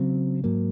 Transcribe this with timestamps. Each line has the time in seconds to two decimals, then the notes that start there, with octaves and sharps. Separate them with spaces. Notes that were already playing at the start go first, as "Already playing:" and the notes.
Already playing: C#3 F#3 C4
0.44 G#2 F#3 A#3